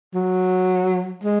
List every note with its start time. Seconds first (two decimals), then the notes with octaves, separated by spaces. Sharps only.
0.15 F#3
1.24 G#3